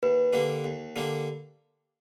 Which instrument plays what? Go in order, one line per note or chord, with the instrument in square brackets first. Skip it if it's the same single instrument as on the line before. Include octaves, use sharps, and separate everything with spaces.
[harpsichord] D#2 [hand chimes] B4
[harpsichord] D3 G3 A#3 D4
D#2
D3 G3 A#3 D4